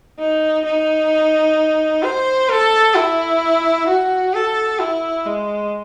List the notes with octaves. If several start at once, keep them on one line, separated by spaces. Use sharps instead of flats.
D#4
D#4
C5
A4
E4
F#4
A4
E4
G#3